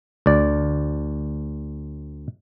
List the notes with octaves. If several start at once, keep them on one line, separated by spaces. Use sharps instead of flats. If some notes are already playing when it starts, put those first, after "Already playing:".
D2 D5